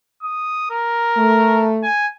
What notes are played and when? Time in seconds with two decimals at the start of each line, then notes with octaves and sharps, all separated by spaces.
0.23 D#6
0.71 A#4
1.17 A3
1.83 G#5